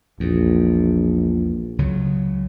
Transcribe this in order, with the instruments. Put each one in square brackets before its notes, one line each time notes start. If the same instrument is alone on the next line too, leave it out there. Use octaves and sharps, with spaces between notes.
[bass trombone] A#1 [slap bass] E2
[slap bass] C#2 C#3 F#3